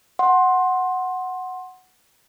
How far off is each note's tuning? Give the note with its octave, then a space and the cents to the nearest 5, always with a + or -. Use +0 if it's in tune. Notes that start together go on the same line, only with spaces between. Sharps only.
F#5 +0 C6 +15